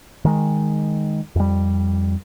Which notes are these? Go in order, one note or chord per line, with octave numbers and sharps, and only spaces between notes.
D#3 G#3
F2 G3